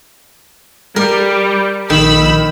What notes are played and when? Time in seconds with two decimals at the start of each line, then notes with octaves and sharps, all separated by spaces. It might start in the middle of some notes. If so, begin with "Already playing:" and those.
0.96 G3 A#4
1.90 A#1 D#3 B5 E6